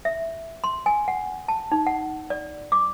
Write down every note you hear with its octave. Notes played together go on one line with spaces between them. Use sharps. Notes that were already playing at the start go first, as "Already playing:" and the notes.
E5
C6
G#5
F#5
A5
D#4
F#5
D5
D6